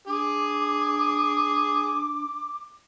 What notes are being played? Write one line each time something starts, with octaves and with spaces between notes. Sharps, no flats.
D4 G#4 D6